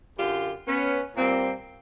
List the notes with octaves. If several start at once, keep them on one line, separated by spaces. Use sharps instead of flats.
F#2 D3 F#3 F4 G4
B3 C#4
A#2 G3 A#3 C4